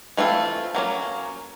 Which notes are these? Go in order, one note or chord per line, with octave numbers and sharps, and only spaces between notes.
E3 A3 C4 F4
F#3 A#3 C#4